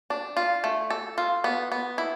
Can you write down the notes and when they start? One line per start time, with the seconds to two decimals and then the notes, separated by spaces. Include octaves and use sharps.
0.10 D4
0.37 F4
0.64 A3
0.90 A4
1.18 F4
1.44 B3
1.72 B3
1.98 E4